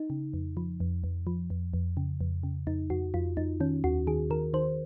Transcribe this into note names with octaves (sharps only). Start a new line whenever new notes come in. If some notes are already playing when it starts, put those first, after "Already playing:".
Already playing: D#4
C#3
F2
F3
F2
F2
F3
F2
F2
C#3
F2
C#3
F2 D#4
F2 F#4
F2 F4
F2 D#4
D#3 C#4
D#2 F#4
D#3 G#4
D#3 A#4
D#3 C5